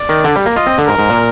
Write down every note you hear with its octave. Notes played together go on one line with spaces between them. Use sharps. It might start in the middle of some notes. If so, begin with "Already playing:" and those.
Already playing: D5
D#3
D3
G3
A#3
F4 D#5
C4
D3
G#2 A#4
G#2
A#2